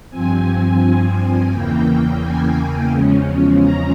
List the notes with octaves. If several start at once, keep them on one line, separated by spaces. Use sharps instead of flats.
G2 F3 C4 G#5
E2 C#3 E3 A#3 G5
G#5
E2 C#3 F3 G#3 C#4
A#5